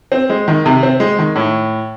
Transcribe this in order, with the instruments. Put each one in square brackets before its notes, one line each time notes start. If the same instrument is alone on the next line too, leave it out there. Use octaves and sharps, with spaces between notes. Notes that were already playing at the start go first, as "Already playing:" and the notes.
[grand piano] C4
G#3
D#3
C3
C4
G#3
D#3
A2